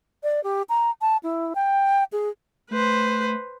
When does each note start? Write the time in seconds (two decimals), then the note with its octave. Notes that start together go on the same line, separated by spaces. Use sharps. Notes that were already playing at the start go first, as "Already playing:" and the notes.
0.23 D5
0.44 G4
0.69 A#5
1.01 A5
1.23 E4
1.55 G5
2.12 G#4
2.71 A3 B4 C5